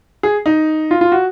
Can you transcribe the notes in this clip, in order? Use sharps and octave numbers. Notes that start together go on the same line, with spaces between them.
G#4
D#4
F4
F4
F#4